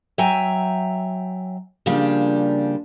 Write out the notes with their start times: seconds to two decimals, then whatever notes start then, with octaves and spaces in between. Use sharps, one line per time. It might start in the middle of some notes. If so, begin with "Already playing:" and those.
0.18 F#3 E5 G5 G#5 A#5
1.86 C#3 F3 G3 A#3 D4 F4